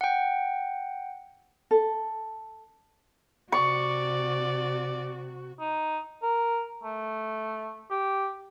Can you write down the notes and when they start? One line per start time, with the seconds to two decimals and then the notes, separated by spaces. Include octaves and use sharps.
0.01 F#5 G5
1.71 A4
3.52 C3 F#4 D5 C#6
5.60 D#4
6.22 A#4
6.83 A3
7.91 G4